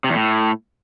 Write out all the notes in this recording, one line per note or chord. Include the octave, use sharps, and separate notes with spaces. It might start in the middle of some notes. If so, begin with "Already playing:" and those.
C3
E2
A2